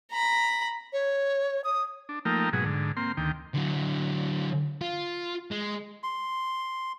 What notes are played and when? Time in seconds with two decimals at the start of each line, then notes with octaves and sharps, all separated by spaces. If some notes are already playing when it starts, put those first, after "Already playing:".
0.12 A#5 B5
0.93 C#5
1.64 D#6
2.09 D4
2.25 F3 A3 A#3 D#4 A#4 G5
2.53 G#2 B2 F#3 G#4
2.65 G#2 D3
2.97 A#3 C4 C6
3.17 D2 D#3 G5
3.54 D3 F#3
4.81 F4
5.51 G#3
6.03 C6